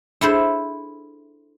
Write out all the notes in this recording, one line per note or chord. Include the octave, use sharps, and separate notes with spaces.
D4 E4 G#4 A4 C5